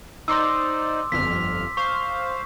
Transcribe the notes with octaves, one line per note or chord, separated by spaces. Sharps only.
D#4 C5 D5 C6 D6 E6
G1 F2 F6 B6
C5 F5 C#6